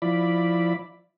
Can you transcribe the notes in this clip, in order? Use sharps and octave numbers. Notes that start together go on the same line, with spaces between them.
F3 E4 D5 B5